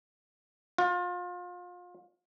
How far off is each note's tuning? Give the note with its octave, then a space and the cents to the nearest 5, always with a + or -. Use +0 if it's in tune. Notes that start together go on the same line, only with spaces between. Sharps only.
F4 +30